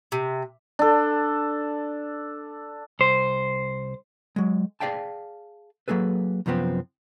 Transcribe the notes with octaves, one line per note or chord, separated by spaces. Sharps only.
C3
D4 A4
C2 C5
F#3 G#3
G#4 B4 D5 F5 G5 A5
F#3 A#3 G#4 A4 B4
F#2 C3 F3 B3 C4